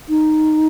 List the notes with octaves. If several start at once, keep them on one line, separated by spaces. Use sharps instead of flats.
D#4